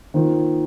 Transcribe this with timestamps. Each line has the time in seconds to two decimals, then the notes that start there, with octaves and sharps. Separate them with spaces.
0.14 D#3 A#3 F4 C5